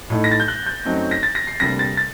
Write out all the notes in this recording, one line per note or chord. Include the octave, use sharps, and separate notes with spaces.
A2 A3 D#4
A#6
A6
G6
F#6
G6
F#2 F#3 A3 C4 D#4
A#6
A6
A#6
C7
D2 C3 G3 A#3 D4 A#6
A6
A6